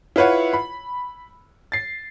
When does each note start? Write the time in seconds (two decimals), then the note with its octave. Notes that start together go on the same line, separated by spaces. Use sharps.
0.16 E4 F4 B4 C#5 F#5
0.53 B5
1.72 A6 C7